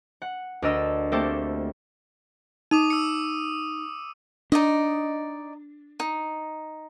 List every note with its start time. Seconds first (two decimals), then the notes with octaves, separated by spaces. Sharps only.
0.22 F#5
0.62 D2 D4 A#4 D#5 E6
1.12 A3 A#3 C4 G4 A4
2.71 D#4 D6 D#6 D#7
2.90 E6 C#7
4.52 D4 D#4 D5 D#5
6.00 D#4